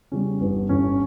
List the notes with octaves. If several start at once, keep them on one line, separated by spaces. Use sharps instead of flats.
E2 C#3 G3 C#4
G1 G2 E3 G3 B3
G1 G2 E3 G3 C#4